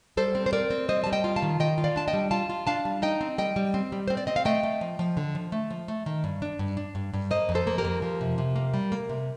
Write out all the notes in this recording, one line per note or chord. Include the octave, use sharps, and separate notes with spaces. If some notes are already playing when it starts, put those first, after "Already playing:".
G3 A4 C5
C4
C5
C4 A#4 D5
C4
G3 C5 D#5
G3 A5
D#5 G5
F4
F5 A5
D#3
D#3 D#5 G5
F4
D5 F5
D4 A5
D#5 G5
G3
F4 F5 A5
F4
D4 F5 A5
G3
D#4 D#5 G5
C4
G3 D#5 G5
G3
C4
G3
C4 C5
D5
C4 D#5
F5
A3 D#5 G5
A3
F3
F3
D3
F3
A3
F3
A3
D#3
G2
D4
G2
D4
G2
G2
A#3 C5 D#5
F2
A4 C5
A#3
G4 A#4
F2
F3
C3
C3
A#3
G3
A#3
C3